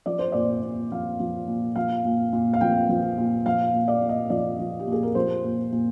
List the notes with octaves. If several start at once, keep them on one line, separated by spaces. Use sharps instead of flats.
F3 D5
C5
A#2 D5
A#2
F3 F5
F3
A#2
F3 F5
A#2
A#2
F5
F3 G5
F3
A#2
F3 F5
A#2
D5
A#2
D#5
F3 D5
F3
G4
A#2 G#4
A#4
F3 C5
A#2
A#2